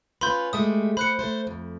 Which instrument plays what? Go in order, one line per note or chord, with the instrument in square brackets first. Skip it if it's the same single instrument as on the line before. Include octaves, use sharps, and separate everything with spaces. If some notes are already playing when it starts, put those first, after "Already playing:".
[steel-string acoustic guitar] C#4 F4 B4 [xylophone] B5 C6 G6
[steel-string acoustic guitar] G#3 A3 G4 [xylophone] D#6
[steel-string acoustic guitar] C5 [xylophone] B5 F#6 C#7
[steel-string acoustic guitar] A3 C5
F2